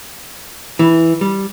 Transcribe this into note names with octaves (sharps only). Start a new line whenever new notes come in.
E3
G3